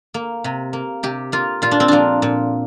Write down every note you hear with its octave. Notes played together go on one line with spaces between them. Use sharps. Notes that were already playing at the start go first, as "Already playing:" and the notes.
A#3
C3
A#3
C3 G4
A#3 F4
A#2 F4
D4
C4
F3 A#3 D4
A#2